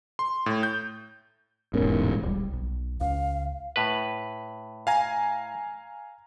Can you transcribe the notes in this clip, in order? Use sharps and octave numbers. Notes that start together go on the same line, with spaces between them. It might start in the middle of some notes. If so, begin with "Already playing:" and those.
C6
A2
G6
E1 G#2 B3 C#4 A#4
A2
D#1 C2 G3
B1
C#2 F5
A2 B4
F5 G#5 A#5